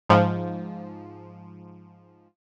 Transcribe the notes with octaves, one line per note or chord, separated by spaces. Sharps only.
G#2 F3